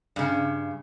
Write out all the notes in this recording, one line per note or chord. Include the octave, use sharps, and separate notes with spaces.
G2 C#3